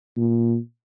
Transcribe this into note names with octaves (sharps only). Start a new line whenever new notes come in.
A#2